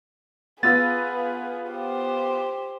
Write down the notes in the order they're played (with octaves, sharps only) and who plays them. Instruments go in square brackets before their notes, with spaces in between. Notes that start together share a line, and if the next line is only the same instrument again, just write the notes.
[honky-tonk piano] B3 F4 [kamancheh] G#4 B4 [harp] E6 A6
[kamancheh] G4 C5